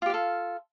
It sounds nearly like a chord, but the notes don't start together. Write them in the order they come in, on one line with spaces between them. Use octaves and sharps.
F4 G4 F5 A4